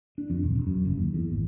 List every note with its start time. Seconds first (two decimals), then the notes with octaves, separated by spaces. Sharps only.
0.18 D4
0.30 F2
0.43 D#1
0.55 E1
0.67 F#2
0.85 F#1
0.98 D#2
1.14 E2
1.30 G#1